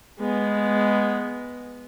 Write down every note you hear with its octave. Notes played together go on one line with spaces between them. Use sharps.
G#3 B3